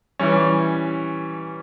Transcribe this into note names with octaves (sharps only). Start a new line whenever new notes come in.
E3 G3 C#4